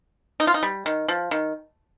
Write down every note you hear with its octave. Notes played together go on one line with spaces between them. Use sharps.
D#4
F4
D#4
G3
D#3
F3
D#3